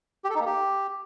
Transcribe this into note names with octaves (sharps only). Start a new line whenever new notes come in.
G4
A4
D#4
A#3
G4